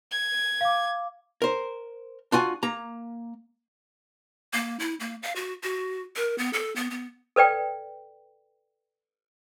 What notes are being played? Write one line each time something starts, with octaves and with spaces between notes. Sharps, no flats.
G#6
F5 D6
A#4 C5
D4 F4 F#4 G#5
A#3 A#5
A#3
E4
A#3
F5
F#4
F#4
A#4
B3
A4
B3
B3
A4 B4 D5 G5